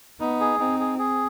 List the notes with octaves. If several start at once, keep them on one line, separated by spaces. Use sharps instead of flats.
B3 D#4
G#4
C4 D#4
G#4
G#4